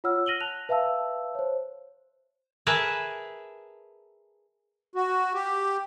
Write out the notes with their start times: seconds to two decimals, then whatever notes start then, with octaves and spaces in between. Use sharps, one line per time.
0.04 F4 C#5 F#5 E6 F6
0.26 F6 A#6 D#7 F#7 G7
0.41 A5 F#6 F7
0.69 B4 E5 F5 A5 E6
1.35 C5 C#5
2.67 G#4 A#4 B4 E5 A5
4.95 F#4
5.34 G4